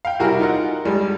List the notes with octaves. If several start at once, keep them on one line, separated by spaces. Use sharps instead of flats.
F5 G5
C3 G3 E4 F#4 G#4 A#4
D#4 F4 A#4 F#5
G2 G3 G#3